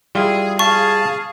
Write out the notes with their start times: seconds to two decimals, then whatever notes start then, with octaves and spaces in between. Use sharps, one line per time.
0.15 G3 E4 F4 G#4
0.59 G#4 F5 A5 C#6